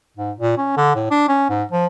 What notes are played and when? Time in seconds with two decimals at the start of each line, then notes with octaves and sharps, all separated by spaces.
0.17 G#2
0.37 A#2
0.58 C#4
0.77 D3
0.95 A2
1.11 D4
1.28 C#4
1.49 G#2
1.72 F3